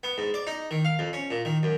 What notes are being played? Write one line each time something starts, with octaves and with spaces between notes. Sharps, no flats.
B3
G#2
D5
D#4
D#3
F5
F2
C#4
A#2
D#3
F#2